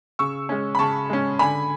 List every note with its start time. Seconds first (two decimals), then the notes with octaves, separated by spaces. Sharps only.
0.19 C#3 C#6 E6
0.49 G#3 C#4
0.75 B5
0.79 C#3 A5 C#6
1.10 G#3 C#4
1.39 D3 G#5 B5